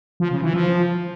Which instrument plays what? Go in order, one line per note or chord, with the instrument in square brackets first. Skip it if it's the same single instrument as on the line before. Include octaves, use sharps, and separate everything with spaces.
[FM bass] F3
C#3
E3
F3